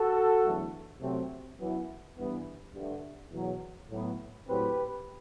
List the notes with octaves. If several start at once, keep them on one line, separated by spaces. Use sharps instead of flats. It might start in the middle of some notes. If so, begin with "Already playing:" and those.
Already playing: F#4 A4
E2 D3 F#3 A3
C3 F#3 A3 C4
F#2 E3 B3
G2 E3 B3
G2 D3 A3
E2 B2 F#3
A2 F#3 B3
A2 F#3 C4 G4 B4